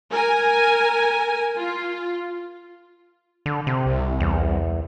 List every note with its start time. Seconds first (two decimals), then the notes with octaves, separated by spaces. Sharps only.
0.11 A#4 G#5
1.57 F4
3.46 D3
3.67 C3
3.86 C2
4.20 E2